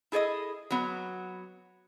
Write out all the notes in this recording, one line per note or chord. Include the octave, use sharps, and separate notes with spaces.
E4 G#4 A4 D5 D#5
F#3 B3